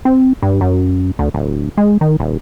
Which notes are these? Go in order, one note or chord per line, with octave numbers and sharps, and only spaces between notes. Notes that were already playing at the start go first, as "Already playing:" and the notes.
C4
G2
F#2
D2
D1
G#3
D#3
D#1